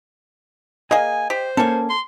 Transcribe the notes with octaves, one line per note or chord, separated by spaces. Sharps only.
A#3 G#4 D#5 G#5
G4 C5
A#3 C#4 A4 G#5
C6